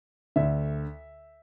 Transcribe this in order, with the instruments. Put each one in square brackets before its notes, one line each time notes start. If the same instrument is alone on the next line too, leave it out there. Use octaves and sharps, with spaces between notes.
[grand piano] D2 D3 E5